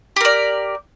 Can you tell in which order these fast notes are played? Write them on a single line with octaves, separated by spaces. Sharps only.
G4 A#4 D5